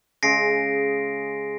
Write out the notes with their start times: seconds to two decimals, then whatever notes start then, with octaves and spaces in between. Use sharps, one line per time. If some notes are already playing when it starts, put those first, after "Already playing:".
0.23 C#3 G#3 A#6 C7 D7